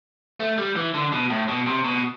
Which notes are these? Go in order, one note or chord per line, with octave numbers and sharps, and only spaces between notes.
A3
G3
E3
D3
B2
A2
B2
C3
B2